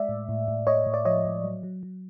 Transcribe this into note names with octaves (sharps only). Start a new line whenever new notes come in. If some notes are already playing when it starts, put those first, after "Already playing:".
Already playing: G#3 D5 E5
A2
A2
A2
A2 C#5 D#5
A2
D5
F3 C#5 D#5
A2
F#3
F#3
F#3